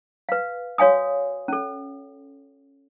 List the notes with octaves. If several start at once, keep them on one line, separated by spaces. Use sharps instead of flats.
B4 F5
F#4 C#5 F5 G#5 D#6
C#4 A4